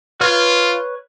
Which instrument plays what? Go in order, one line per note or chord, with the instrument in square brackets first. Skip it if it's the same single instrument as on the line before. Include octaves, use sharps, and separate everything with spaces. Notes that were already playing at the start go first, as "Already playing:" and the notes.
[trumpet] F4 [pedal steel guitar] B4 C#5 F6